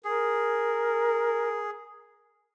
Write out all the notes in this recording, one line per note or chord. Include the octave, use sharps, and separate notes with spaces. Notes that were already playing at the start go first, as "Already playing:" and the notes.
G#4 A#4